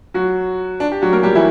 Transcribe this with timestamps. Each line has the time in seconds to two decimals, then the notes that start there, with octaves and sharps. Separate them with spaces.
0.14 F#3 F#4
0.80 D4
0.92 G4
1.02 F#3 F#4
1.13 A#3 A#4
1.23 G3 G4
1.35 E3 E4